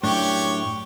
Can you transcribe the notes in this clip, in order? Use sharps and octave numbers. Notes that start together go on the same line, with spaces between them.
F#2 A2 D4 G4 C#5